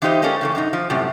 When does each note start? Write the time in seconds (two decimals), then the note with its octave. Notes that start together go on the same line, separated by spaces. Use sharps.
0.02 E3 D#4 F4 G4 C5 D#5
0.22 G#3 A#3 C#4 G4 A4
0.41 C#3 E3 A3
0.55 F#2 C3 D#4
0.73 F3
0.90 F#2 A2 C3 G3